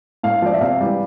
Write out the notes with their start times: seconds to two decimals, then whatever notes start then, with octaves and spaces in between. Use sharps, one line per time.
0.23 A2 F5
0.42 F3 D5
0.54 E5
0.61 C3 F5
0.81 E3 G3